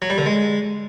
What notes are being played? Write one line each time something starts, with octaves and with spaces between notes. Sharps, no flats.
F#3
G3
D3
G#3